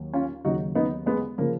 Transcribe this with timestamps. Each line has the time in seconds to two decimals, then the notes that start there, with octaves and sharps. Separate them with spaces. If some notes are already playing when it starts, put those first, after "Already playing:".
Already playing: D#2 F#3
0.14 C#4 F4
0.45 D#2 C#3 F#3 D#4 F#4
0.75 B3 D#4
1.06 G#3 B3
1.38 C#3 F3 A#3